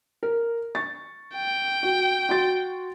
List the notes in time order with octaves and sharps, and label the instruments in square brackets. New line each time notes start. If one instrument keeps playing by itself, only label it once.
[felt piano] A#4
C#6 A6
[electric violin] G5
[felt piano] F#4
F#4 C6 A6